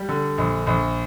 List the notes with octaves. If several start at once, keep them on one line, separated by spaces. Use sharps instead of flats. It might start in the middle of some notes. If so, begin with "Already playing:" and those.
Already playing: G3
D3
A#1
A#1